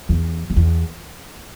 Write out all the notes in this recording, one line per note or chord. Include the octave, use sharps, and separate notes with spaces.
E2
F2
E2